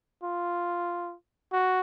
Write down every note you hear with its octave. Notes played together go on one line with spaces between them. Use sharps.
F4
F#4